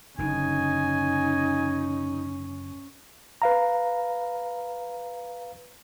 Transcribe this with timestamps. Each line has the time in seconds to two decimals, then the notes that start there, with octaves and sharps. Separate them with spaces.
0.18 F#1 D3 C#4 D#4 G#5
3.42 B4 F5 A#5